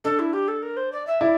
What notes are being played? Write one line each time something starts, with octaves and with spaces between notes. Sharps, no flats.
D4 A4
E4
G4
A4
A#4
C5
D5
E5
E4 D5